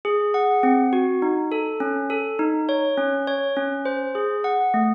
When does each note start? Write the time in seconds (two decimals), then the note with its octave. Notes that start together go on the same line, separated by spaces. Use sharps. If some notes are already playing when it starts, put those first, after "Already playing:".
0.05 G#4
0.34 F#5
0.63 C4
0.93 F#4
1.22 D#4
1.52 A4
1.80 C#4
2.10 A4
2.39 D#4
2.69 C#5
2.98 C#4
3.27 C#5
3.56 C#4
3.85 C5
4.15 G#4
4.44 F#5
4.74 A3